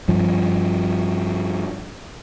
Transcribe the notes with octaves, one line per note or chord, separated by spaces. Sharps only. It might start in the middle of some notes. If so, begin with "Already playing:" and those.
G2 F3